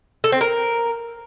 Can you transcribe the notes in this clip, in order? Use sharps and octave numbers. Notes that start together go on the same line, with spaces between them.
A4
C4
A#4